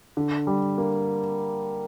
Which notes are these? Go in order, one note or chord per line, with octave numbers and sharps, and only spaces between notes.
D3
G3
A#3